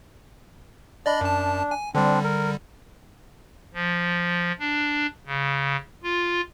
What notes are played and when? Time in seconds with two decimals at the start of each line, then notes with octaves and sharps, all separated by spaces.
1.06 D4 D5 D#5 B5
1.21 F#2 A5
1.71 G#5
1.95 D3 G3 C4 D4
2.24 A#4
3.74 F3
4.60 D4
5.26 C#3
6.03 F4